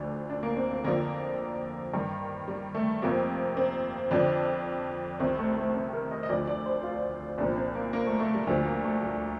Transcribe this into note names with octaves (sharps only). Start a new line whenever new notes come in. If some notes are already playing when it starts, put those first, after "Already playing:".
Already playing: D2 D3 F3 D4
D4
A#3
C4
C4
F2 D3 F3 A#3
G2 D#3
G3
A3
F2 C3 F3 A#3
C4
F2 D3 F3 D4
C2 C3 D#3 C4
A3
A3
C4
A#4
D#5
D#5
D2 D3 F3 D5
D5
C5
F4
C2 A#2 F3 D4
C4
A#3
A#3
A3
A3
G3
D2 D3 F3 G3
A#3
A3
G3